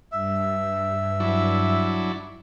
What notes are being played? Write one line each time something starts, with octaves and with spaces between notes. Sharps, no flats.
G2 E5
F#3 D4 E4